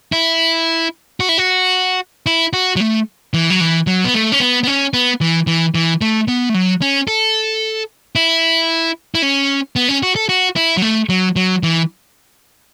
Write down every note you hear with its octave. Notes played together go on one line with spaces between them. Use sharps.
E4
F#4
E4
F#4
E4
F#4
F#3
A3
E3
F#3
E3
F#3
B3
A3
C#4
B3
B3
C#4
B3
E3
E3
E3
A3
B3
A3
F#3
C#4
A4
E4
E4
C#4
B3
C#4
F#4
A4
F#4
E4
F#3
A3
F#3
F#3
E3